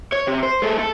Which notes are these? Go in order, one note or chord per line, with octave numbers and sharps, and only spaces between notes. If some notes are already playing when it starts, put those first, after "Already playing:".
C#5
C3
C5
G#3 A4
A4